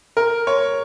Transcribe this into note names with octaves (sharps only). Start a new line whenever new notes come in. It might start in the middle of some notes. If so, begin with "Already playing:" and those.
A#4
C#5